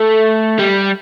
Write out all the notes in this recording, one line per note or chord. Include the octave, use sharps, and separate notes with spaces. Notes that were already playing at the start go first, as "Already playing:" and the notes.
Already playing: A3
G3